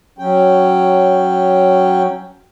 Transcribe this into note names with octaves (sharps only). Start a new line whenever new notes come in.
F#3 C#4 G5